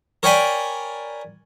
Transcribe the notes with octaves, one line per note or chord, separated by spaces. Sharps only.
A#4 C#5 D5 G5 G#5 B5